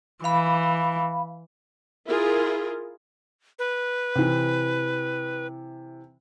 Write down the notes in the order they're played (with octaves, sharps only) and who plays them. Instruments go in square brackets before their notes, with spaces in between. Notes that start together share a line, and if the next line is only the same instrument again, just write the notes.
[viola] E3 [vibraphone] F5 B5
[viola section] E4 F4 G#4 A#4
[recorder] B4
[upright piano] C3 E3